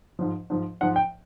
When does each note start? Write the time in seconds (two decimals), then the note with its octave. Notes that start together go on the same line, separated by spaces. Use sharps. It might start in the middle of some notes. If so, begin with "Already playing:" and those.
0.19 G#2 F3
0.50 G#2 F3
0.81 G#2 F3 F#5
0.96 G5